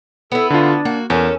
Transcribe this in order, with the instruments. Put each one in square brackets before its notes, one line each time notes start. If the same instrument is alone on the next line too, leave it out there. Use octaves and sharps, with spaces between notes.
[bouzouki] B3 E4 [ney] A4
[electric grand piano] D3 F4 [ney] D4
[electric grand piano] A#3 [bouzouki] F#4
[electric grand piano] E2 [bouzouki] C#4 A4 [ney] A#4